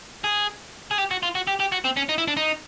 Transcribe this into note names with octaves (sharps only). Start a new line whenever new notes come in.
G#4
G#4
G4
F#4
F4
F#4
G4
G4
F#4
C4
C#4
D#4
E4
D4
D#4